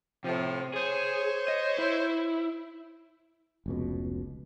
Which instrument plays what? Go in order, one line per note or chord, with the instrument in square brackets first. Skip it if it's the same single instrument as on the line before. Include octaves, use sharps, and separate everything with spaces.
[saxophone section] A2 F3 [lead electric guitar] C3
[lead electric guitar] G#4 [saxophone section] C5 C#5
[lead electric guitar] D#5
E4
[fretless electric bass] F1 C#2 B2